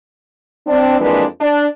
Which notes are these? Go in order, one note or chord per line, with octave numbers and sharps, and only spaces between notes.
C4 D4
F2 E3 G#3 A#3 D4 B4
D4